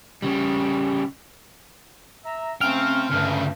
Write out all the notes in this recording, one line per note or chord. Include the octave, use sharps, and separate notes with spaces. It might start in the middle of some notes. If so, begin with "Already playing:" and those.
C#3 G3
E5 A#5
C#3 A3 C4 C#4 G5 F6
D2 G2 C#3